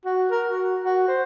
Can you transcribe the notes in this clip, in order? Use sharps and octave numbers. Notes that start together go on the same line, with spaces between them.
F#4
A#4
F#4
F#4
C5